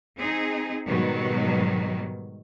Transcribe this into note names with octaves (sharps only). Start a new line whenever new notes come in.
C4 D#4 G#4
G#2 B2 D#3 F#3 G3